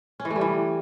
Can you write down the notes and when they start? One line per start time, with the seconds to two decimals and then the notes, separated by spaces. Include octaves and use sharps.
0.20 C#4
0.25 E3
0.30 A3
0.36 G3
0.41 E3